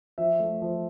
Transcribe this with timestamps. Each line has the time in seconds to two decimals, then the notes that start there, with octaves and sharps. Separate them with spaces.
0.18 F3 E5
0.39 A3
0.62 F3